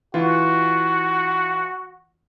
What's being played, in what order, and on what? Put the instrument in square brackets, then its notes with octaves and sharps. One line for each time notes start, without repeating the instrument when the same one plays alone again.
[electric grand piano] E3 F4 [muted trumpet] F#4